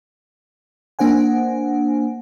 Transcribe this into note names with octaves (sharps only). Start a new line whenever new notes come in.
A#3 D4 C5 F#5 G#5